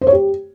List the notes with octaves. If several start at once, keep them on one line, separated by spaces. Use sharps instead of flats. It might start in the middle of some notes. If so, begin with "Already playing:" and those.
C5
C#5
G4